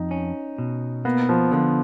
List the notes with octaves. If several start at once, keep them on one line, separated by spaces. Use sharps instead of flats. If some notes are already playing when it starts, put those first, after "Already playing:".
Already playing: F2 D#4
C#4
B2
A#3 B3
F3
D3 F3